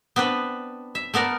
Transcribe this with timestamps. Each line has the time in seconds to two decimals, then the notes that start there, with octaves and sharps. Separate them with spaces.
0.16 B3 C4 D4 B4
0.95 E5
1.14 A3 B3 A#4 D5